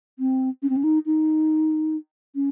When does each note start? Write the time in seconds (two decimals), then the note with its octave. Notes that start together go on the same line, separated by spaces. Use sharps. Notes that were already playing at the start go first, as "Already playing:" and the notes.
0.19 C4
0.63 C#4
0.70 C4
0.77 C#4
0.84 D#4
1.06 D#4
2.35 C#4